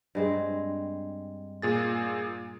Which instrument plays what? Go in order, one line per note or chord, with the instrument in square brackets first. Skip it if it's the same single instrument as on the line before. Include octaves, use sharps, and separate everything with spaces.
[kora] G2 G#3 C4
[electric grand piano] A#2 G#4 A6